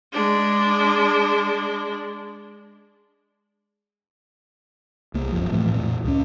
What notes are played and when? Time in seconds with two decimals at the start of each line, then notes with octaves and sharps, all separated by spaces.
0.13 G#3 D4
5.14 C2 A#3
5.32 D#1 F#2 F3
5.52 A2 E3 A3 C4
5.75 F2 A#2
6.04 C#2 C#4